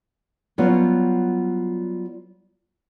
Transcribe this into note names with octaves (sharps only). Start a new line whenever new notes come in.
F#3 G3 B3 C#4 F4 G4